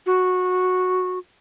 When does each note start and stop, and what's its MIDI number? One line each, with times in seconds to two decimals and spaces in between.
0.06 1.19 66